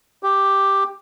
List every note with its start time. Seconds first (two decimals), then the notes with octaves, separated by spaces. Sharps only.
0.23 G4